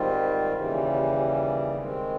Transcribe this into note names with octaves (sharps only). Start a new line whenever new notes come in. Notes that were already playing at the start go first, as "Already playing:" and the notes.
Already playing: G#2 D#3 G3 C4 F4
D#2 C#3 E3 G3
D#3 G#3 C4